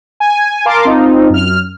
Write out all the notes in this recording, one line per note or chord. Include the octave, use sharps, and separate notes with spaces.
G#5
A#4 F5 A5 C6 D6
C4 D#4 F4
F#2 F6